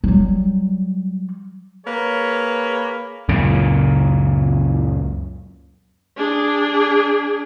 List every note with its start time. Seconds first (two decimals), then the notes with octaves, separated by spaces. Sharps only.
0.04 F#3 G3
1.86 A#3 G#4 B4 C#5
3.29 C#2 F#2 A#2 C#3
6.17 D4 G#4